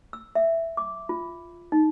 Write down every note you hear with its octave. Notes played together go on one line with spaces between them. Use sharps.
E6
E5
D6
F4
D#4